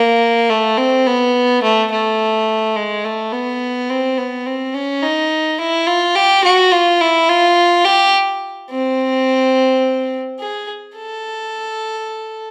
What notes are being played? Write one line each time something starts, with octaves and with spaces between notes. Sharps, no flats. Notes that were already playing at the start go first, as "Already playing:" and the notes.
Already playing: A#3
A3
C4
B3
A3
A3
G#3
A3
B3
C4
B3
C4
C#4
D#4
E4
F4
G4
F#4
F4
E4
F4
G4
C4
G#4
A4